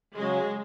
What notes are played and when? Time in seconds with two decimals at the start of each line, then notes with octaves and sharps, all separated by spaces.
0.15 C#3 F#3 G#3 C#4 F#4